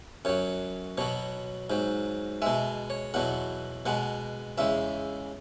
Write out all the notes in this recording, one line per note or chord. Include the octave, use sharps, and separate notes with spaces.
F#2 F#3 C#5
B2 F#3 C#5
G#2 F#3
B2 G#3 E5
C#5
E2 B2 F#3 F#5
B2 G#3 F#5
E2 C#3 G#3 E5